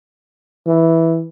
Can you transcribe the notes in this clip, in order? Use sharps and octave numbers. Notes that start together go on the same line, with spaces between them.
E3